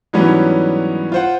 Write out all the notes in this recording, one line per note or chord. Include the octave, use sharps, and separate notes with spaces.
G#2 E3 F#3 G3 B3 C#4
F4 C5 F#5